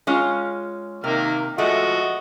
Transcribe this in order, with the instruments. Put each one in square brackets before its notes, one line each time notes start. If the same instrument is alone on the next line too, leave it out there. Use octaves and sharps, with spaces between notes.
[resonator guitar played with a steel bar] G#3 C#4 F4
[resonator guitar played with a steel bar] C3 [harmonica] D#3 A#3 F6
[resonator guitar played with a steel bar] F3 G#3 A3 [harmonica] F#4 D#5